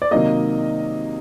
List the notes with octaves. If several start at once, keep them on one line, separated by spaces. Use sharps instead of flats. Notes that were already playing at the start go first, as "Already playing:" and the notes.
D5
C3 D#3 F#3 A#3 D#5